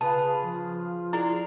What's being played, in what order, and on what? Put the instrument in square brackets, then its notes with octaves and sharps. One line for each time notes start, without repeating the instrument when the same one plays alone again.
[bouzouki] C#3 F4 G#4 [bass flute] B4 [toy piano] A5
[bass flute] F3
[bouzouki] D4 G#4 A#4 [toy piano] E4